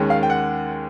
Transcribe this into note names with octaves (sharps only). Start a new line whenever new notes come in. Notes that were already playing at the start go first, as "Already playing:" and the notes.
Already playing: D#2 D#3 G#3 C#4
F5
G5
F#5